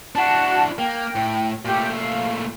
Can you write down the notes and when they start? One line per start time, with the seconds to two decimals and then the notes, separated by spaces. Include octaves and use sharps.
0.15 D4 E4 F#4 A5
0.79 A#3 G5
1.16 A2
1.65 A#2 A3 G4
1.93 F5